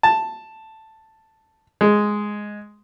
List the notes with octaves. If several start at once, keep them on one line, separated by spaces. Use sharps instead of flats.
A5
G#3